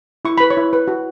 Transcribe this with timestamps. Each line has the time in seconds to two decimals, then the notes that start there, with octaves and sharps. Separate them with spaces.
0.25 E4 C#6
0.38 B4 B5
0.50 C#5 C#6
0.57 E4
0.73 B4
0.88 F#4